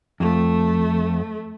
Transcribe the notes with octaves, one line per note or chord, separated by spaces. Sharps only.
F2 A3